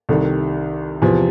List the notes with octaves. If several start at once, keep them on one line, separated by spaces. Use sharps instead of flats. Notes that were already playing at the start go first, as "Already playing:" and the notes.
C2 C3 D#3 A4
E2 C3 F3